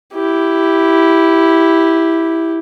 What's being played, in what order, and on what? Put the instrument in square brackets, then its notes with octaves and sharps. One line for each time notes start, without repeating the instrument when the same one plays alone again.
[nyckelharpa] E4 G4